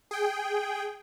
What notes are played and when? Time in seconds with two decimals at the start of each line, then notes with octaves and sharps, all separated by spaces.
0.11 G#4 G5